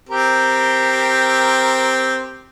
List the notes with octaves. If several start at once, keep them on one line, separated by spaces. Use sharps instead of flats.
C4 G4 A#4